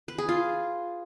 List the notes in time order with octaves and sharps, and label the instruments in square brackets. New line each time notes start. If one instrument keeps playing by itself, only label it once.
[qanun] B4
G#4
F4